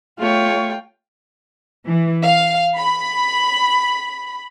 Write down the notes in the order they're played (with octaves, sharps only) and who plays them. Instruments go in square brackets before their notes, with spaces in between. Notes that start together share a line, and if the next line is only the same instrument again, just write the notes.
[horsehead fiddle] A3 C#5 [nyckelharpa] F4 G5
[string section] E3
F5
B5